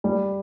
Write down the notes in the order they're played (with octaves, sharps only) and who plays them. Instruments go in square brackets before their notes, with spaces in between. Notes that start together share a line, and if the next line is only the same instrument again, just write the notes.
[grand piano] G3